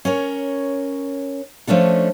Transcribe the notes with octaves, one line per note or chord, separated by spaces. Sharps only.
C#4 A#4 C#5
F3 A3 C#4 D4 A4